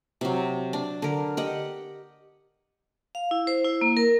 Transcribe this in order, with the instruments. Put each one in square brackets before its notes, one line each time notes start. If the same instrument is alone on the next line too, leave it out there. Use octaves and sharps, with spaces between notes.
[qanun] C3 F#3
D4
D3 A#4
G4 D#5 F#5
[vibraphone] F5
E4
C5
E4
A#3
A#4